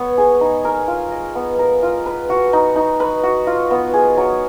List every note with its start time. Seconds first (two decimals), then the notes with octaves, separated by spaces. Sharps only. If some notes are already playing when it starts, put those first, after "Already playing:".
Already playing: B3 C#5
0.18 G#4
0.41 D#4
0.65 A#4
0.88 F4
1.11 D#5
1.35 B3
1.59 A#4
1.83 F4
2.06 B4
2.29 F#4
2.53 D#4
2.76 D#4
3.00 B4
3.23 F#4
3.47 F4
3.71 B3
3.94 G#4
4.17 F#3